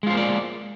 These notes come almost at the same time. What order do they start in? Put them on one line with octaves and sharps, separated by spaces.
G#3 F4 C5 A#3 D5